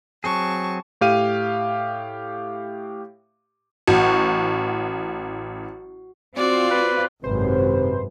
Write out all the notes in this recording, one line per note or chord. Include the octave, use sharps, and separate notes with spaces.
F#3 C4 G#4 A5 C#6
A2 G4 F5 D#7
A1 F#4
C4 F4 F#4 D5
B4
G#1 F#2 C3 B4 C5